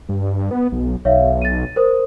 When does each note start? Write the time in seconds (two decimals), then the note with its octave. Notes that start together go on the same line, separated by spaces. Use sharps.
0.09 G2
0.51 B3
0.72 B1
1.05 B1 C#5 E5 F5
1.42 A6 D#7
1.76 A#4 C5 D#6